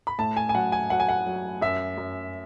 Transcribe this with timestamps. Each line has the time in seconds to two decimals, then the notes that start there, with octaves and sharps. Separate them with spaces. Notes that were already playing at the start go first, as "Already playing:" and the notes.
0.07 B5
0.19 A2 A5
0.37 G#5
0.49 G#5
0.55 F#3 F#5
0.72 G#5
0.90 F#3 F#5
1.00 G#5
1.09 F#5
1.26 F#3
1.62 F#2 E5
1.98 F#2